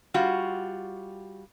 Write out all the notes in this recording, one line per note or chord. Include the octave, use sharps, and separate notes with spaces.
G3 F4 F#4